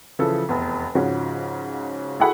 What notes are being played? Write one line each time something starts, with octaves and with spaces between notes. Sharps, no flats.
C#3 E3 F3 A4
F1 E2
G#2 C#3 F3 C#4 F#4
E4 F#4 G#4 A4 F#5 B5